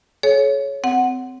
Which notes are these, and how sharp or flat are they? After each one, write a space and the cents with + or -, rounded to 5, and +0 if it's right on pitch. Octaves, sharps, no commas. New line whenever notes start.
G#4 +45 C#5 +0
C4 -20 F#5 +0